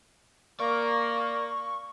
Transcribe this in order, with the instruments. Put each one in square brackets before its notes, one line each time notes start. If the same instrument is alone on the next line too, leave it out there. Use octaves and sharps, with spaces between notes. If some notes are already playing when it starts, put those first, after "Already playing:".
[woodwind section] A#3 [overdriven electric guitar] D5 [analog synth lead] C#6